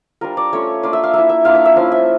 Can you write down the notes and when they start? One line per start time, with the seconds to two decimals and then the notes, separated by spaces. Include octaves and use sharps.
0.21 G3 D4 F4 A#4
0.37 D5
0.53 A3 C#4 F4 C#5
0.83 A#3 D4 F4 D5
0.93 E5
1.03 F5
1.14 A#3 E4 E5
1.29 E5
1.45 A#3 D4 F4 F5
1.55 E5
1.65 E5
1.76 F3 C#4 E4 F5
1.92 E5